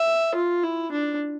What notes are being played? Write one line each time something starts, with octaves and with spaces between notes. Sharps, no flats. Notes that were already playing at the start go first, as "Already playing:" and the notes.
Already playing: E5
F4
E4
D4